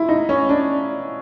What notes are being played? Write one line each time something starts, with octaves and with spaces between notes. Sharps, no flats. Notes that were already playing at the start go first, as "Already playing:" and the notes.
Already playing: E4 F4
D#4
C#4
D4